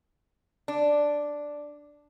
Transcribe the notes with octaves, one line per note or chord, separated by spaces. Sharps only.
D4